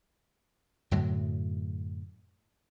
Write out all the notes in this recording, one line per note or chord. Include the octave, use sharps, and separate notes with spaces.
F#2 A2 D3 F#3